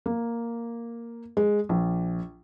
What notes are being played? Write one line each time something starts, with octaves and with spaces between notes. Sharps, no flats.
A#3
G#3
A#1